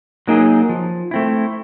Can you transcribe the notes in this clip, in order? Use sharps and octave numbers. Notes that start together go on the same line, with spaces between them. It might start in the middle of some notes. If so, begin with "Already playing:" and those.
F#3 A#3 D#4 G#4
F3
A3 C4 E4